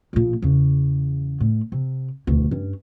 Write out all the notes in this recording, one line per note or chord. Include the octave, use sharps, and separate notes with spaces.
A#1 A#2
E2 C#3
A2
C3
E1 D2
G2 C#4